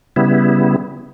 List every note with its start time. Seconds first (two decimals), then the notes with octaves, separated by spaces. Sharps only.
0.16 C#3 G3 B3 E4